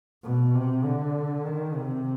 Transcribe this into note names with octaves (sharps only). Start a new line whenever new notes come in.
B2
C3
D3
D#3
C3